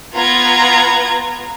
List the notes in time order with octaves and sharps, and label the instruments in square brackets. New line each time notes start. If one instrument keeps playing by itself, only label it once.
[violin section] B3 F4 A#5 G#6